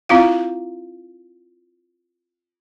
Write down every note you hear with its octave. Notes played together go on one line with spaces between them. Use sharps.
C4 E4 F4 F5